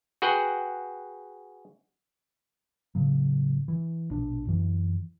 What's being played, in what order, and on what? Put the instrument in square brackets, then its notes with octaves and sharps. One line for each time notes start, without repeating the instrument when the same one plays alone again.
[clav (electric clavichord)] F#4 G#4 B4 F#5 G5
[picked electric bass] A2 C#3 F#3
E3
A#1 B2 D4
F#2 E3